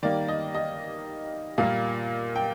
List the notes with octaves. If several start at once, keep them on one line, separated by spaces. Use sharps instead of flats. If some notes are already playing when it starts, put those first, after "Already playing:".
D#3 G3 A#3 D5
D#5
D#5
A#2 G3 A#3 F5
G5